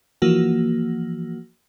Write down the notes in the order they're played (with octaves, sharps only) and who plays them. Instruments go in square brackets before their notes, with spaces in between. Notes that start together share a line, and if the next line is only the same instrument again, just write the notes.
[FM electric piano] E3 F3 A#3 F#4